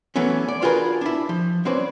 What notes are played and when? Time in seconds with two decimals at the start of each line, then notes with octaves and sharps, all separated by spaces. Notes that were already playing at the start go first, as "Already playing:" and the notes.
0.16 E3 F#3 A3 B3 C#4
0.48 D5
0.62 D4 F4 F#4 G#4 A#4 B4
1.01 D4 E4
1.29 F3
1.65 F#3 C4 C#4 B4 C5 D5